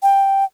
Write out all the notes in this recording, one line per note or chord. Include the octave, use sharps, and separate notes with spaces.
G5